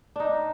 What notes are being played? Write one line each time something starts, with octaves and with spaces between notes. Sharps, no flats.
D4 D#4